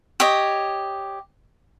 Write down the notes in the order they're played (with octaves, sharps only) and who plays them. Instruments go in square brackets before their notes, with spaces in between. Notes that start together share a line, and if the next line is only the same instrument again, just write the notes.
[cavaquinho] G4 C#5 D#5